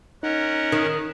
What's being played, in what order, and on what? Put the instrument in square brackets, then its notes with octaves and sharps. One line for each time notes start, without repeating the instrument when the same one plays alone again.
[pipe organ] C#4 A#4 F#5 [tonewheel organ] D#4
[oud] D#3